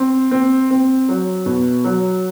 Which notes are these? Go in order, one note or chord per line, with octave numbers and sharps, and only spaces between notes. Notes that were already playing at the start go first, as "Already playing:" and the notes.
Already playing: C4
C4
C4
F#3
B2
F#3